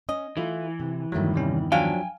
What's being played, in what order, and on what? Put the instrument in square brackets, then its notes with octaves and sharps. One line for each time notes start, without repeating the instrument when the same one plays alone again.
[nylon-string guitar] C#4 [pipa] D#5
[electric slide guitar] E3 [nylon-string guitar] A3 E4 F4
[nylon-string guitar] C3
[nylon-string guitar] E2 G2 D#3 [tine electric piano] F#3 A3
[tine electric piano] C3 G3 C#4
[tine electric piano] F3 F#3 D4 [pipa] F5 [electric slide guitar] G5 G#5